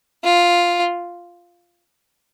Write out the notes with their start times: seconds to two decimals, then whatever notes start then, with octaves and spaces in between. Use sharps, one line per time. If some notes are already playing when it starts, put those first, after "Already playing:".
0.24 F4